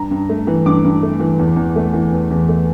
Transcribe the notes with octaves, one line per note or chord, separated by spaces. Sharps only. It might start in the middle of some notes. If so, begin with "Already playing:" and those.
Already playing: G2 A#5
G2
A3
E3
G2 D6
G2
A3
E3
E2
E2
A3
E3
E2
E2
A3